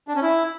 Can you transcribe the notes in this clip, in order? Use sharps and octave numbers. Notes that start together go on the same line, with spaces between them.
D4
C#4
E4